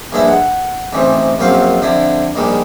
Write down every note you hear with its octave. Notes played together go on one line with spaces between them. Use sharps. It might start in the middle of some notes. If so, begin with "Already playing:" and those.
A#1 G2 G#3 E4 E5 B5
F#5
A1 G#2 E3 C4
A#1 F#2 F#3 C4 F5
F2 D3 E4
A#1 D#3 G3 G#3